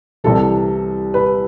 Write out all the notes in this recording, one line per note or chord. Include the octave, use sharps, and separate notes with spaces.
C2 C3 E3 A4
B4